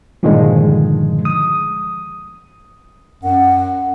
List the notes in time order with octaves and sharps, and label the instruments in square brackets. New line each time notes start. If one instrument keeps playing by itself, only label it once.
[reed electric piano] G2 A#2 D3 D#3 F3 G#3
D#6
[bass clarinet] F#2 [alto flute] F#5